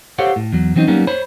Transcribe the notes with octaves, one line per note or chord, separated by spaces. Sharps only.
G4 A4 C5 C#5 F5 F#5
A2
E2 F#3
E3 F#3 C4 C#4 D#4
F#3 G3 A#3 B3 C#4 D#4
C5 C#5 B5